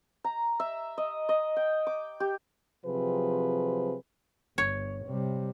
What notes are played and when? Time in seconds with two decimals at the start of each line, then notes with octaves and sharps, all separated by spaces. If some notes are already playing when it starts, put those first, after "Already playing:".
0.24 A#5
0.60 E5
0.98 D#5
1.29 D#5
1.56 G5
1.87 D6
2.20 G4
2.85 C3 F3 F#3 C4 G#4 B4
4.58 G1 C#5
5.06 C3 G3